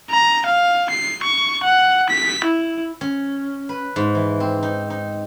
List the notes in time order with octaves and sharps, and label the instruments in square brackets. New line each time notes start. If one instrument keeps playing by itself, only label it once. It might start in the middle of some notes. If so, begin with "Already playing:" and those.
[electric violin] A#5
F5
C7
C#6
F#5
B6
E4
[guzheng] C#4
B4
G#2
E3
C4
D#4
D#4